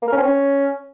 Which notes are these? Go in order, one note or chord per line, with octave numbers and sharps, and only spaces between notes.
A#3
A#4
C#4
C4
C#4